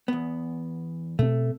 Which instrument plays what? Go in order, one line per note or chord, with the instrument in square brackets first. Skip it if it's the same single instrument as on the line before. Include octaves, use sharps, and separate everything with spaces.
[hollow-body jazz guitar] E2 B3
[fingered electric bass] B2 C4 [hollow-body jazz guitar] A3